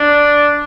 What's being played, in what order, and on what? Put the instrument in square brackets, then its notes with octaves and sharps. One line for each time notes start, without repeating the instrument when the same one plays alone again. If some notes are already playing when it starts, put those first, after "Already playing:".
Already playing: [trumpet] D4